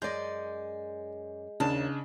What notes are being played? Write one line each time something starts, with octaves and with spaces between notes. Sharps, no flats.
F#2 G#3 D5 D#5 G6
D#2 C#3 D4 A5